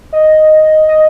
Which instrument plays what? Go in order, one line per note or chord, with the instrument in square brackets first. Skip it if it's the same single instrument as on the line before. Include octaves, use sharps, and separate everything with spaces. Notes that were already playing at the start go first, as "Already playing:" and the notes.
[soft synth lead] D#5
D#5